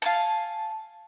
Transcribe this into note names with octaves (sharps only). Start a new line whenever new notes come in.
F5 G#5 A5